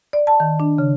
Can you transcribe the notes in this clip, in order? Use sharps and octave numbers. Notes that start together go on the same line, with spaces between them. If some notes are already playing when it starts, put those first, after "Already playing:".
D5
A5
D#3
D4
C#3